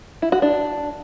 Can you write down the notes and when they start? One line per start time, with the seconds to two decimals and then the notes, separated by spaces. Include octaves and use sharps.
0.22 E4
0.32 F#4
0.42 D4